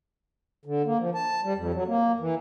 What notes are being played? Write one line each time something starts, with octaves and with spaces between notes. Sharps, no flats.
D3
A#3
F3
A5
G3
F2
F#3
A#3
E3